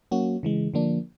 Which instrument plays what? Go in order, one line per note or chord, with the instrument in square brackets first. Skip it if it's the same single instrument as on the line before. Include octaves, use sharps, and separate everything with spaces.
[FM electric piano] F#3 A#3 C#4 F#4
C#3 E3 G#3
D3 F3 A#3 D4